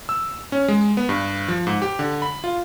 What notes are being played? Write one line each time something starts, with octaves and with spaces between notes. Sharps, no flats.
E6
C#4
G#3
B3
G2
F3
G#2
G4
D3
B5
F4